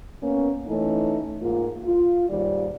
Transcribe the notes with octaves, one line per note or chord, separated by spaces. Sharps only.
A#3 B3 C#4
E3 A3 C#4 D#4
G#2 A#3 F4
F4
D#2 G#2 G3 D5